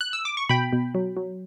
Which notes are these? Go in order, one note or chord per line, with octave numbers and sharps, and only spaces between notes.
F#6
E6
D6
C#6
B2 G5 B5
B2
F#3
F#3